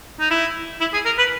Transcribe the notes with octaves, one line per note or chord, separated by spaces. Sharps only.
D#4
E4
E4
G#4
A#4
B4